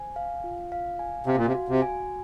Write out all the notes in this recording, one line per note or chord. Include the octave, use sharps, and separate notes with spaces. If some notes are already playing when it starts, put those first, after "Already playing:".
Already playing: C5 G#5
F5
F4
F5
G#5
C3 F5
A#2
C3
F#4
C3
G#5